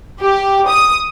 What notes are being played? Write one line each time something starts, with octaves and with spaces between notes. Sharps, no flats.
G4
D#6